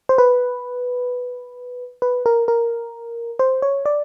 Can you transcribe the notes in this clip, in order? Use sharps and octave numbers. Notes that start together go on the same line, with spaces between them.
C5
B4
B4
A#4
A#4
C5
C#5
D5